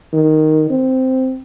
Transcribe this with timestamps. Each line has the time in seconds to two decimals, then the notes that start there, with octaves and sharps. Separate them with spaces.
0.13 D#3
0.70 C4